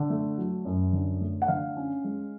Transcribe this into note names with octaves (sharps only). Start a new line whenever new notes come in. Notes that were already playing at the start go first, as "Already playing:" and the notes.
Already playing: D3
A3
F#3
F#2
D3
A3
F#5
D3 F5
C#4
G#3